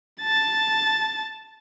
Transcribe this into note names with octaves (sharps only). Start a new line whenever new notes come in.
A5 A6